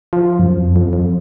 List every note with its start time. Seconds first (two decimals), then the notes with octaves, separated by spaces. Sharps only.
0.13 F3
0.39 F#2
0.57 F2
0.76 F2
0.93 F2